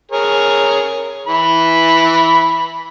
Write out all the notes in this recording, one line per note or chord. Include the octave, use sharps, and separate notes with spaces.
G#4 A#4 C#5
E3 B5